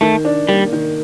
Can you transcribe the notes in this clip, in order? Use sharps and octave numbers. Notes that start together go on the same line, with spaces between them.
D#3 A3
D4
G3 A#3
D#3